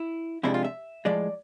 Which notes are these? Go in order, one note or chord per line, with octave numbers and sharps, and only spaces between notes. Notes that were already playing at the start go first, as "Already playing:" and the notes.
Already playing: E4
F2 C3 G#3 D4 E4
F4
E5
A2 F3 G#3 D5